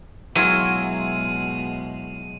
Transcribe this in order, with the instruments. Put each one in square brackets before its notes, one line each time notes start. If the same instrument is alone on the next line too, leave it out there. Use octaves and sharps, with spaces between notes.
[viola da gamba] B2 G#3 [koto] F#3 [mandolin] E4 F4 G#4 [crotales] D#7